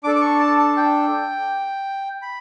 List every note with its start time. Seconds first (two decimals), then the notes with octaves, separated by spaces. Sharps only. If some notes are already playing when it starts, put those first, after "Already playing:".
0.04 D4 D6
0.07 A4
0.16 D6
0.21 C#6
0.39 A5
0.58 A5
0.77 G5
2.22 B5